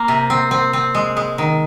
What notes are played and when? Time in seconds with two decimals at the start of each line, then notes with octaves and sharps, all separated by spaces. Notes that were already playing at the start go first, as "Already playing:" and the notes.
Already playing: A#3
0.08 C3
0.30 C4
0.51 C4
0.73 C4
0.95 G#3
1.17 G#3
1.38 D#3